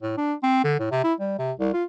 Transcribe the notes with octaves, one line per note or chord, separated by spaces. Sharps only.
A2
D4
C4
D3
A2
C3
E4
G3
C3
C2
F4